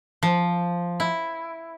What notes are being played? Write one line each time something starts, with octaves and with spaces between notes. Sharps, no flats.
F3
E4